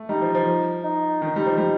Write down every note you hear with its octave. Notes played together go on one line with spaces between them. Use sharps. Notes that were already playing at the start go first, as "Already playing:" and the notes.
Already playing: A3
G3 D#4
F3
F3
D#4
D#3
G3
F3
G3